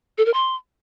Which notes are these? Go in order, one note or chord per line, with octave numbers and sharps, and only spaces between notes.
A4
A#4
C6